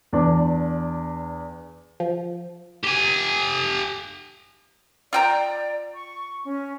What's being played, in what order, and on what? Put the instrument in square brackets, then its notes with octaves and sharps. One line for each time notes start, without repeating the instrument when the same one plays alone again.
[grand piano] E2 D4
[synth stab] F3
[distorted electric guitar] G4 G#5
[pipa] F4 G5 A#5 [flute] D5
[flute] C#6
C#4